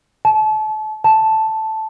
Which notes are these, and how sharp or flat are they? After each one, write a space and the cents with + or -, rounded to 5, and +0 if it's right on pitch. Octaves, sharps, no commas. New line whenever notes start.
A5 -35
A5 +0